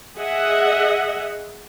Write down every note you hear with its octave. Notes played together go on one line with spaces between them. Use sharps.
G#4 D#5 E5 F#5